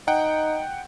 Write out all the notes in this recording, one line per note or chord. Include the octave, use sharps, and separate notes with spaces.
D#4 F#5 G5 G6